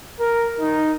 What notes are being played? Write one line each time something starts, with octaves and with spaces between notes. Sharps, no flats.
A#4
D#4